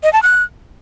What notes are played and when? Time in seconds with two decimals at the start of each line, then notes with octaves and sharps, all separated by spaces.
0.03 D#5
0.13 A5
0.23 F#6